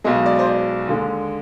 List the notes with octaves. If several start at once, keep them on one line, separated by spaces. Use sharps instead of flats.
B1 B2 G#3 D#5
D5
C5
D5
D#2 D3 G#3